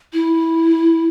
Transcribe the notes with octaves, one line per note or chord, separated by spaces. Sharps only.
E4